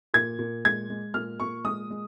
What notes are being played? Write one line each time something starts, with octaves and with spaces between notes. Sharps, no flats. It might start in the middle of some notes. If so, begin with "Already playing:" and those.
A#2 G#6
A#2
G#3 G#6
G#3
A#2 F6
A#2 C#6
G#3 D#6
G#3